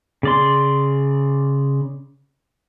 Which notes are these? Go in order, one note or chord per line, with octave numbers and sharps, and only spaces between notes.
C#3 D5 C6